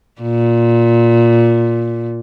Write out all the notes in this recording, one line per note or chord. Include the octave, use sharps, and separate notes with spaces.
A#2